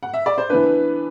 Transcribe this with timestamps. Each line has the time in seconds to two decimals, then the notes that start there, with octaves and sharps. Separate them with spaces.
0.03 F#5
0.14 E5
0.26 D5
0.38 C5
0.50 E3 B3 D4 B4